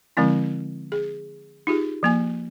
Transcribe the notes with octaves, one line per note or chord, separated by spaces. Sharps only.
D3 F3 G#3 C4 E4
G#4
D#4 F4 G4 G#4
F3 A#3 G#5